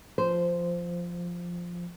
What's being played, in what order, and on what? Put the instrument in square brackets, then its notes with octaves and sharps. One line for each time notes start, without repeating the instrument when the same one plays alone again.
[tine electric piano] F3 [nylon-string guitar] C5